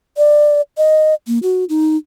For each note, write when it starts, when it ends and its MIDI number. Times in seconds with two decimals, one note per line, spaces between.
0.17 0.61 74
0.77 1.14 75
1.27 1.39 58
1.43 1.64 66
1.69 1.97 63